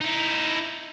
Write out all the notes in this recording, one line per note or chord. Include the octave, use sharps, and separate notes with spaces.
D#4 E4